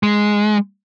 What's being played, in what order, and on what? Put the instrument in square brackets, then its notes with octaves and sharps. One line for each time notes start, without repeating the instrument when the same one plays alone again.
[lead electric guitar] G#3